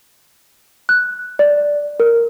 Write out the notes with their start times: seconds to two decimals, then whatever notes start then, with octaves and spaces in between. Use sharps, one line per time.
0.89 F#6
1.39 D5
2.00 A#4